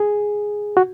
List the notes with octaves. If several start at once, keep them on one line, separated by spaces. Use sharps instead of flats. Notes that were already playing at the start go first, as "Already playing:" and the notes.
Already playing: G#4
F#4